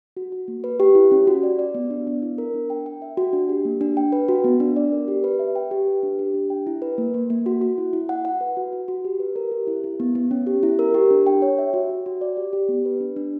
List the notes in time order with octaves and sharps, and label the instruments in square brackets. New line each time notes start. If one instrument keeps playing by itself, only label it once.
[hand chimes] F#4
F#4
A#3
B4
G4
E4
C#4
F#4
D5
D5
B3
D4
B3
E4
A#4
D4
G5
G5
E5
F#4
D4
G4
A#3
D4
G5
B4
F#4
B3
D4
D5
A#4
G4
B4
E5
G5
G4
B4
D4
G4
D4
G5
E4
B4
A#3
A#3
A#3
F#4
F#4
E4
E4
F#5
F#5
B4
F#4
F#4
F#4
G4
B4
A#4
G4
E4
E4
B3
B3
C#4
G4
E4
A#4
G4
D4
G5
C#5
E5
F#4
F#4
F#4
D5
G4
G4
B3
B4
D4
D4